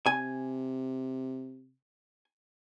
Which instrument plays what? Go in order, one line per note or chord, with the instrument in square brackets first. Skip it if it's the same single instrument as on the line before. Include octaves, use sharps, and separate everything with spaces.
[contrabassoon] C3 [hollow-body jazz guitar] G#5